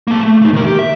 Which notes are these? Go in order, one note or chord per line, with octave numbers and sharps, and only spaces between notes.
A#3 A5
A3
A3 D#4
D#2 A#4
G4
E5